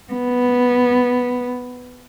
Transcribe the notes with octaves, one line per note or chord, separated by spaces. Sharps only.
B3